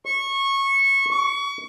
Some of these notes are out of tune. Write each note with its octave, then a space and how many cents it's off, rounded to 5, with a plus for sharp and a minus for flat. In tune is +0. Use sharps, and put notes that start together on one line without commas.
C#6 -20
C#6 +30